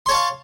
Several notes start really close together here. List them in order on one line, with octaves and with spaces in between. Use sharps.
C6 C#5 A5 F5